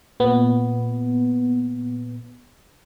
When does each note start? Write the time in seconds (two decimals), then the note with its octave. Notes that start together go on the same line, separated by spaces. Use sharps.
0.20 A#2 B3